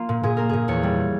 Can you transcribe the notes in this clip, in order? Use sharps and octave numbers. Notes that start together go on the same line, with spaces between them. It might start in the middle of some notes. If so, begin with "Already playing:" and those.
Already playing: A#3 F4
A#2
A#2 G#4
A#3 A#4
A#2 G#4
E2 C#5
G3